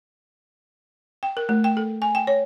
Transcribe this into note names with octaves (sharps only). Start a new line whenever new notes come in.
G5
A#4
A3
G5
A4
G#5
G5
C#5